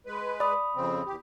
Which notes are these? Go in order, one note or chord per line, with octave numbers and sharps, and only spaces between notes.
G#3 B4
D5 B5 D#6
F2 C#3 C4
E2 G4